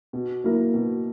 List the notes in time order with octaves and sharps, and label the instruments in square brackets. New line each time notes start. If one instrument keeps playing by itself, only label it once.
[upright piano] B2
F#3 A#3 E4 A#4
B2